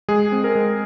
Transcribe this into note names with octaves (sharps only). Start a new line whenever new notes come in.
G#3 G#4
C4
A#4
G#3